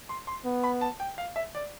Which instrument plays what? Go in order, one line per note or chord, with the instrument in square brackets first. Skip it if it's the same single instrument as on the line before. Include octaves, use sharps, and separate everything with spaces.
[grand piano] C6
C6
[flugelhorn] B3
[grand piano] B5
A5
G5
F5
E5
D5